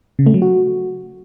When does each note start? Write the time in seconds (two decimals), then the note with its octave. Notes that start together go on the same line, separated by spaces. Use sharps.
0.19 C#3
0.26 A3
0.34 F#3
0.42 F#4